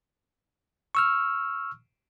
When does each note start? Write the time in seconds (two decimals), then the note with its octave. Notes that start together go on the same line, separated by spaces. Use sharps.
0.95 C#6 E6 F6